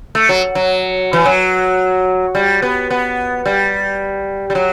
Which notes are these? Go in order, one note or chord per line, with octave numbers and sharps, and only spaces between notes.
A3
F#3
F#3
E3
F#3
G3
B3
B3
G3
G3
F#3